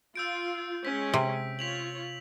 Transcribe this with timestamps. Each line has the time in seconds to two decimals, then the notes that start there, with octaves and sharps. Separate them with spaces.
0.16 F4 E6 G6 D7
0.85 G#3 C#4 B6
1.14 C3
1.59 F4 C#5 B6 F7 F#7